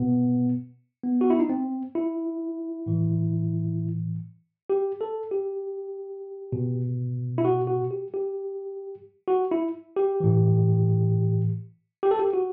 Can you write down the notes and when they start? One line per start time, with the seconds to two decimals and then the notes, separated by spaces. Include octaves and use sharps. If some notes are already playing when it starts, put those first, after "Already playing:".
Already playing: B2 B3
1.03 B3
1.21 F#4
1.30 E4
1.39 D#4
1.49 C4
1.95 E4
2.86 A2 E3
4.70 G4
5.01 A4
5.31 G4
6.52 B2
7.38 E4
7.45 F#4
7.67 F#4
7.91 G4
8.14 G4
9.28 F#4
9.51 E4
9.96 G4
10.20 A2 E3
12.03 G4
12.11 A4
12.19 G4
12.33 F#4